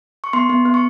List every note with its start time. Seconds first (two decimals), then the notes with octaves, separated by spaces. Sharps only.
0.24 C#6
0.33 B3 C6
0.49 B3
0.65 B3
0.74 C#6